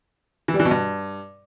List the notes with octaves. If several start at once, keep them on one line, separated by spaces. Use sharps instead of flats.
E3
G3
E3
B2
G2